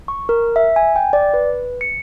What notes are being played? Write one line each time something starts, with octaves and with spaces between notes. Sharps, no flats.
C#6
A#4
E5
G#5
G5
D5
B4
C#7